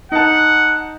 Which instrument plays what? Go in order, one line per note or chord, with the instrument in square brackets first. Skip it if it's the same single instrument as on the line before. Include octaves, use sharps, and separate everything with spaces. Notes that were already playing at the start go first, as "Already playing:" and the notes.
[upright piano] D#4 A5 [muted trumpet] F#5